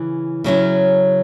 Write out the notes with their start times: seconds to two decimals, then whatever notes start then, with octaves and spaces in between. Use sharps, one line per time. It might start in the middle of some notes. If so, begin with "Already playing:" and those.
Already playing: C#3 E3
0.44 C#3 F#3 C#4 E4